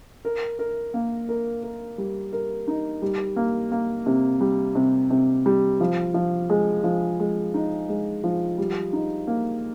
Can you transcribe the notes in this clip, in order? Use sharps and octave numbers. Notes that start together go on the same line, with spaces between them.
A#4
A#4
A#3
A#4
A#4
G3
A#4
D#4
G3
A#3
A#3
C3
G3
C3
C3
G3
F3
F3
G#3
F3
G#3
D#4
G#3
F3
G3
D#4
A#3